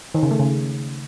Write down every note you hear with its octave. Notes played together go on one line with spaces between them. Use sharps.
D#3
C#3
A3
C#3